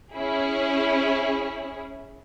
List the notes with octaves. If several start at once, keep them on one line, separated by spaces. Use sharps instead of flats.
C#4 E4 G#4